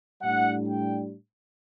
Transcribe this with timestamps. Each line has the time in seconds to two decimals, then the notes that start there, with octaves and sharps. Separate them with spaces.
0.21 A2 G3 D4 F#5
0.68 G5